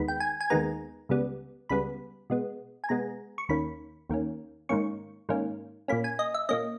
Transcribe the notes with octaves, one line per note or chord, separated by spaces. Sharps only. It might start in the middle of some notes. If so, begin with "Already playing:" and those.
Already playing: D#2 D#3 G#3 B3 B5
G5
G#5
G#5
D#2 D#3 G#3 B3 A#5
C#2 C#3 G3 B3
C#2 C#3 G3 B3 B5
B2 G#3 B3
G#5
B2 G#3 B3 A#5
C#6
D#2 D#3 A#3 C#4 B5
D#2 D#3 A#3 C#4
G#2 D#3 A#3 C#4 C#6
G#2 D#3 A#3 C#4
A#2 A#3 C#4 B5
G#5
D#5
E5
A#2 A#3 C#4 D#5